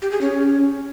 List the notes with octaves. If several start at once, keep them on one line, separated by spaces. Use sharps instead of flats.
G4
G#4
C#4